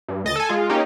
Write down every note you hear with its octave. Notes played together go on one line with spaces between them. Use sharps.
G2
D2 D#5 A6
A4 G#5
G#3 F4
A#3 C#4 D#4 G4